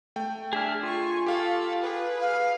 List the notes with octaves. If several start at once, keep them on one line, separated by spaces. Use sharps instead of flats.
A3 G5
D4 G#4 E5 F6
F4 G#5 C#6
G4 A4 F5
G#4 B4
F5